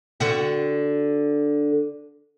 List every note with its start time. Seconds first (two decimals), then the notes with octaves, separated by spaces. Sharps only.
0.20 D3 F#4